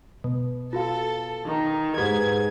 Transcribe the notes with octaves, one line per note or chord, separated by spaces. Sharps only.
B2
F4 F#4 A4 F5
D#3
G#2 G4 B4 G#6